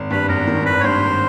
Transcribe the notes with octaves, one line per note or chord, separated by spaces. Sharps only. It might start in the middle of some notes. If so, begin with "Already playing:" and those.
Already playing: G#1
G2 B4
G#1 A#4
D#3
G#1 B4
C#5
G2 C5
G#1